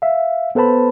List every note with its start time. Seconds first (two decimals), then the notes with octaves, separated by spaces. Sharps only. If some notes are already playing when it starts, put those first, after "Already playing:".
0.02 E5 F5
0.55 B3 A4 B4 C5 A5 B5